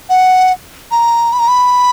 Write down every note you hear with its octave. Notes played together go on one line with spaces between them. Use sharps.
F#5
A#5
B5
A#5
B5